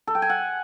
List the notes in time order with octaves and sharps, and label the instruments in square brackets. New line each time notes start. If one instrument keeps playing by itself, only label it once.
[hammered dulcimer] A4
G5
G#5
F#5